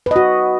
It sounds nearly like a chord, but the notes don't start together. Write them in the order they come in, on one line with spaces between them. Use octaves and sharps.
B4 D#5 F#4